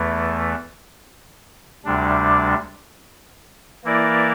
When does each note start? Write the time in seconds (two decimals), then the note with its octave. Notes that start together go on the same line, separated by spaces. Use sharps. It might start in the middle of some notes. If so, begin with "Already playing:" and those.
Already playing: E2 E3 A3
1.85 D2 C3 G3 D4
3.84 E3 A#3 E4 A#4 D5